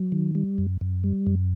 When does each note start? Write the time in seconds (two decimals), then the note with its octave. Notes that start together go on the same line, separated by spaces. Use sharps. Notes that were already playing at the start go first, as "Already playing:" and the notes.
Already playing: F#3
0.12 D#3
0.35 G3
0.58 F#2
0.81 F#2
1.04 G3
1.27 F#2